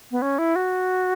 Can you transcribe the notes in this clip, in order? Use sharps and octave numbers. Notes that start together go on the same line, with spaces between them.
B3
C#4
E4
F#4